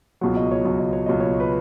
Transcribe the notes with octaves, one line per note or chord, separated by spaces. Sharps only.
C#2 B2 F#3 F#5
D#5
C#5
C#2 B2 F#3 C#5
D#5
C#5
C#2 B2 F#3 D#5
C#5
B4